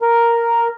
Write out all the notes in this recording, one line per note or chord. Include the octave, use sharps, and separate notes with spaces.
A#4